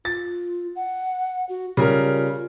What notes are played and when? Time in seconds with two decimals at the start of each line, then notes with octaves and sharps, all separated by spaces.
0.05 F4 A6
0.76 F#5
1.49 F#4
1.77 C#3 G3 F4 A#4